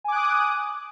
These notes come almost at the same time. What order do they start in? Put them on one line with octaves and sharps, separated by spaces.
G#5 D6 F#6 D#6